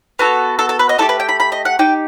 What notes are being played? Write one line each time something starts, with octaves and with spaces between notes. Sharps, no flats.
B3 F#4 A4
A4
A4
B4
D#5
A3 E4 G4 A4
B4
G5
B5
B5
D#5
F#5
D#4 G4 G5